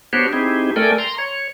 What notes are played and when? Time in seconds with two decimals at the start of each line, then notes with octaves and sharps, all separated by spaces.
0.13 B3 D4 F#4 G4 C5 C#5
0.33 C4 D#4 E4 G4 G#4
0.76 A3 A4 A#4 D5 G5 G#5
0.98 A#5 C6
1.18 C#5